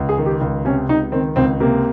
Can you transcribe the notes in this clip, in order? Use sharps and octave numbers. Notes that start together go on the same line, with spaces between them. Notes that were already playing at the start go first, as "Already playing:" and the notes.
Already playing: C#2
G#4
D#3
G4
C#2
C3 C#4
C#2 D#4
D#3 C4
C#2 C4
C3 A#3